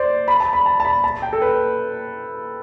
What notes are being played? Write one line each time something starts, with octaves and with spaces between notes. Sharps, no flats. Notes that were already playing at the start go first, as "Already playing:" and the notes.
Already playing: C5 D5
B5
A5
B5
A5
A5
B5
A5
G5
A4
B4